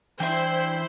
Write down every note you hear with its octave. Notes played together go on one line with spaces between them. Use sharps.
E3 D4 E4 C5 E5 G5